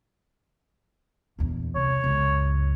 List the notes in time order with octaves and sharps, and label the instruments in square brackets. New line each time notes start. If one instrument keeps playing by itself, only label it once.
[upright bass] A#1 E2
[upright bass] C2 [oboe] C#5
[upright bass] C#2 F#2